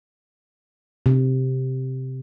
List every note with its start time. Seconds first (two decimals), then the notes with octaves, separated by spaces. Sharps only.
1.06 C3